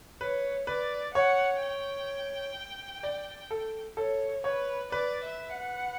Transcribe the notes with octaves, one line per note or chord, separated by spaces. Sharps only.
B4 C#5
B4 D5
C#5 F#5
G5
D5
A4
A4 C#5
B4 C#5
B4 D5
E5
F#5